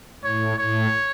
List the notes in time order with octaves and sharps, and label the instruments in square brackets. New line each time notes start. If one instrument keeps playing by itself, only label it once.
[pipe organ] A2 [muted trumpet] C#5
[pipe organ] A2 [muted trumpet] C#5